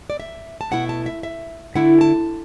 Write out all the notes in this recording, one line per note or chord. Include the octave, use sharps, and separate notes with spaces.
D5
E5
A5
B2 A3 E4 F#5
A5
E5
E5
D3 A3 E4 F#5
A5